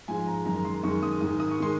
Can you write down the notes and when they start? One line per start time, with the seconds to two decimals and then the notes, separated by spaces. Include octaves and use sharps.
0.08 G#2 F3 G#3 G#5
0.27 A#5
0.45 F#2 D#3 G#3 A#5
0.56 A#5
0.65 C6
0.83 F#2 D#3 G#3 C#6
1.03 D#6
1.21 G#2 D#3 G#3 D#6
1.40 D#6
1.51 C#6
1.60 D#3 G#3 C6